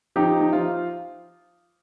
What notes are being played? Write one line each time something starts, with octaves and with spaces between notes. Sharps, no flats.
F3 D#4 G4
D#4
F3 F4